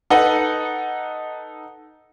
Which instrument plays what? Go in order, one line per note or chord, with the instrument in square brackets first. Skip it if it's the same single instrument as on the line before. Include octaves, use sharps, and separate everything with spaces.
[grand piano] D#4 A4 B4 D#5 F#5